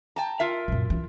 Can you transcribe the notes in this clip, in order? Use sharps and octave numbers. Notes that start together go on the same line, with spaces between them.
G5 A5 A#5
F4 A#4 E5
F#2 A#2
E3